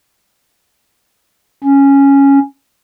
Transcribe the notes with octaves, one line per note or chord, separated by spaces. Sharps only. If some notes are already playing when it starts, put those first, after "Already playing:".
C#4